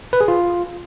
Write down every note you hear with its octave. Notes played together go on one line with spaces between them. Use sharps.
B4
G#4
F4